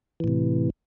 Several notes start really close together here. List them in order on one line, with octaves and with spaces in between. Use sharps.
E3 A2 C3